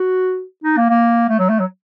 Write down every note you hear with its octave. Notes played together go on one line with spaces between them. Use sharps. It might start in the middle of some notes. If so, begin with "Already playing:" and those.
Already playing: F#4
D#4
A#3
A#3
A3
F#3
A3
F#3